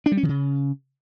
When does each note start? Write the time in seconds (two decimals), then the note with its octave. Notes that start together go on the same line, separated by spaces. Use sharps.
0.06 D4
0.12 G3
0.17 C#4
0.23 E3
0.29 C#3